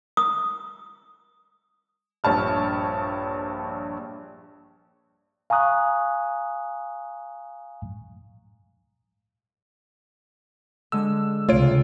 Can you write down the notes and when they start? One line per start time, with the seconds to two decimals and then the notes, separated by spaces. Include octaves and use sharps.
0.17 D#6
2.24 A#1 G2 C#5 A5 F6
5.50 F5 G#5 A#5 C#6 D#6 F#6
10.92 D3 G#3 E6
11.49 C#2 C3 A3 F4 C#5 F5 D7